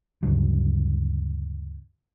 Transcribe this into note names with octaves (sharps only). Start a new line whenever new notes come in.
D2 G2 C#3 F#3